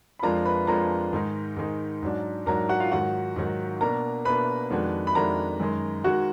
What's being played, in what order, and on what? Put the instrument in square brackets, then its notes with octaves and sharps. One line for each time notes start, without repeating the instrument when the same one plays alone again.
[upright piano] B5
[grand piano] F2 F3 G#3 D4 F4 [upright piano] A#4 A#5
[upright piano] B4 B5
[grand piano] F2 F3 G#3 D4 F4 [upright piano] A#4 A#5
[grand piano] G#2 D#3 G#3 D#4
G#2 D#3 G#3 D#4
G#2 F#3 D4
[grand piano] G#2 F#3 D4 [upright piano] A#4 A#5
[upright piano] F#4 F#5
F4 F5
[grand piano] G#2 D#3 F#3 [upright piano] F#4 F#5
[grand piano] G#2 D#3 F#3
[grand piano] B2 A#3 D4 [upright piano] A#4 A#5
[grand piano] B2 A#3 D4 [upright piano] B4 B5
[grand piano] F2 D#3 G#3 D4 F#4
[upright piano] B5
[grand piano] F2 D#3 G#3 D4 F#4 [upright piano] A#4 A#5
[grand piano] F#2 D#3 G#3
[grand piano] D#3 G#3 [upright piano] F#4 F#5